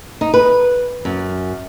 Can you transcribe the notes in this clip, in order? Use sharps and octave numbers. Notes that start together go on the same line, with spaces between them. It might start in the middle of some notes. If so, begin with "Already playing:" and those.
D#4
B4
F#2